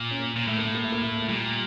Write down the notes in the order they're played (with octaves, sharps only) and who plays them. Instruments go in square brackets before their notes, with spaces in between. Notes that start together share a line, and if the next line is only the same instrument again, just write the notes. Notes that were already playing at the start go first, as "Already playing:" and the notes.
Already playing: [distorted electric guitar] A#2
[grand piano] C#4
A#3
[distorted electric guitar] A#2
[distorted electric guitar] A2 [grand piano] A3
[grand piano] A#3
A3
A#3
A3
A#3
A3
A3
[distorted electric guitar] A#2 [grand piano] G3